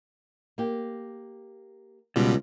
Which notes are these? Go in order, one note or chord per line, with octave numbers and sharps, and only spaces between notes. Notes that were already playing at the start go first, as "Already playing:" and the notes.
A#3 G4
C#2 B2 G3 F4